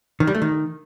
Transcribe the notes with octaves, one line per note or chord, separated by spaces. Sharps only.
D#3
G3
A3
D#3